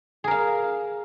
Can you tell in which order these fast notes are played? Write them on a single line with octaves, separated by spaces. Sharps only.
G#4 A#4 F5